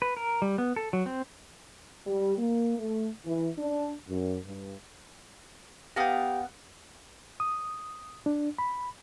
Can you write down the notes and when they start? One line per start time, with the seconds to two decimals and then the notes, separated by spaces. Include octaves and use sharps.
0.02 B4
0.17 A#4
0.42 G3
0.58 B3
0.76 A4
0.93 F#3
1.06 C4
2.07 G3
2.38 A#3
2.78 A3
3.26 E3
3.58 D4
4.09 F#2
4.45 G2
5.96 B3 G4 F5 G5 A#5
7.40 D#6
8.26 D4
8.58 B5